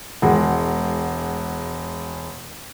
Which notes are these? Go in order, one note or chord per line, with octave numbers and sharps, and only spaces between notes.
E1 G#3 F#5